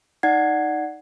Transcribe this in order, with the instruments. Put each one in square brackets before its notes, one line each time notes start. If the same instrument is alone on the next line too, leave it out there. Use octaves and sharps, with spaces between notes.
[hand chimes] D#4 D5 F#5 G#6 C7